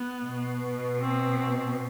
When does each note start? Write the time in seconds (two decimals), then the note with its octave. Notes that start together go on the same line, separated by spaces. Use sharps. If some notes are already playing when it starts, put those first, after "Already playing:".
Already playing: B3
0.23 B2
1.00 C4